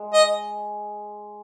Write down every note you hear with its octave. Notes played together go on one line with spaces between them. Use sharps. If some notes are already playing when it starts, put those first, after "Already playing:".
Already playing: G#3
D#5